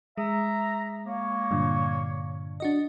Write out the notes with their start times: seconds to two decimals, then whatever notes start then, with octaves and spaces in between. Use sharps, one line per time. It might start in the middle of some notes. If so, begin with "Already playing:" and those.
0.18 G#3 E5 A#5
1.06 A#3 C#5
1.51 G2 A#2 D3
2.60 D4 F#4 D#5